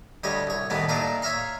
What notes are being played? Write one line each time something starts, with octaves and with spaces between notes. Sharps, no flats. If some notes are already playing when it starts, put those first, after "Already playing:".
D2 G3 C#5 D#5
C2 C#5
C2 A2 D#3 E3 B3
A#2 A3 D4 D#4 F4 A#5
C#5 E5 F5 A#5 C6